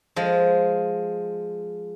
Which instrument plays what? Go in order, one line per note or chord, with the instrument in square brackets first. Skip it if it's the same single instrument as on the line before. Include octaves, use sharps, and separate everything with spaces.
[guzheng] F3 G#3